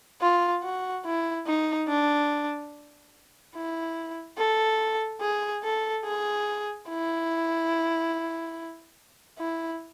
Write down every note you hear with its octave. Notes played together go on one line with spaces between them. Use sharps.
F4
F#4
E4
D#4
D4
E4
A4
G#4
A4
G#4
E4
E4